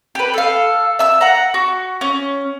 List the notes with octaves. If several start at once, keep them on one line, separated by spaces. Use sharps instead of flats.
G4 B4
A4 F5
E5 E6
F#5 A#5
F#4
C#4